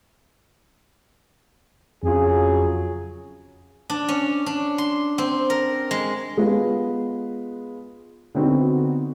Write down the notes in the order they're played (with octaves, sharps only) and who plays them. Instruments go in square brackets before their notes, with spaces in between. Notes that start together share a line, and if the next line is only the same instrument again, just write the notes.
[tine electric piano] F2 F4 [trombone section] C#3 F#3 G#4
[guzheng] D4
C#4
D4
C6
C4
A#4
G#3
[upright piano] G#3 B3 F4 B4
D3 B3 C4 D#4 F#4